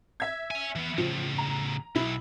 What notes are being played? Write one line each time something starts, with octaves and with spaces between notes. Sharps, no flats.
E5 G#6
C#5 G#5
E3 B3
A2 C#3 F3
A#5
B1 E4